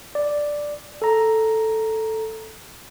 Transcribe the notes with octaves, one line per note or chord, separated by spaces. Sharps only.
D5
A4 A#5